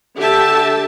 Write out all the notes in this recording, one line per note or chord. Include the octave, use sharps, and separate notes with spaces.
D3 G4 A4 E5 A5